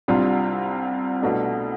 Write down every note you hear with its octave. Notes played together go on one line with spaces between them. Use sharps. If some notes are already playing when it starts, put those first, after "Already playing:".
C2 C3 G3 D4 F4
C2 B2 A3 D4